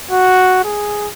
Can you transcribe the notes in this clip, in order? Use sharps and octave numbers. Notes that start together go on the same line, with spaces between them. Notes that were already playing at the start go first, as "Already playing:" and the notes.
F#4
G#4